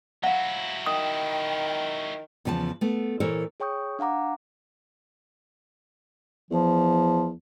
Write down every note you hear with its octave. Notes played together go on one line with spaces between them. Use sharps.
F#3 E4 F5 F#5
D#3 G5 D#6
E2 C#3 F3 G5 A5
A3 B3
A#2 E3 A4 A#4 C5 C#5
G#4 C#5 G5 C#6 D#6 G6
D4 F5 F#5 A#5 D6
E2 F3